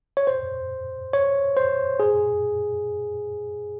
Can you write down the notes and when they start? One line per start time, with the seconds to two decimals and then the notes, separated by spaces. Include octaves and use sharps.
0.17 C#5
0.27 C5
1.13 C#5
1.57 C5
2.00 G#4